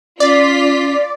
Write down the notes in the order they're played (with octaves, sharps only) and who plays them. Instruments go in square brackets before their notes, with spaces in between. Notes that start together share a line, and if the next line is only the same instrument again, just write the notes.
[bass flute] C#4 [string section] F4 B6 [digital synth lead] D5